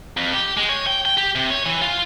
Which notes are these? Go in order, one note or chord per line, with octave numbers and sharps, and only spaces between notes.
F2
G4
G#3
C#5
G5
G5
G4
C3
C#5
E3
F4